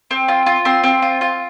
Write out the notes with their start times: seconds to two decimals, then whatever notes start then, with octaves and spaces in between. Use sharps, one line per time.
0.11 C4
0.28 F4
0.46 F4
0.65 C4 C6
0.84 C4
1.02 F4
1.21 F4